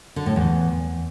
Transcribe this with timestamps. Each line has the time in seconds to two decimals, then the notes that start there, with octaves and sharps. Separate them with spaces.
0.16 D3
0.26 A2
0.36 E2